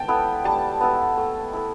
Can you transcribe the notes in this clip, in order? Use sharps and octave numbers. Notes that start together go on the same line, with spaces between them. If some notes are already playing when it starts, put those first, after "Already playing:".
Already playing: G5 A5
B3 E4 A4
G3 A5
B3 E4 A4
A3
E4 A4